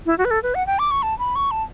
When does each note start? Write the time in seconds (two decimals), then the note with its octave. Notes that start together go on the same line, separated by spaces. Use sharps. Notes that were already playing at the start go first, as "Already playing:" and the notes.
0.06 E4
0.18 F#4
0.25 B4
0.31 A4
0.43 B4
0.55 F#5
0.67 G5
0.79 D6
0.91 C#6
1.03 A5
1.19 B5
1.35 C#6
1.51 A5